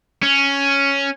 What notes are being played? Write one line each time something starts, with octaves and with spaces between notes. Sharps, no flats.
C#4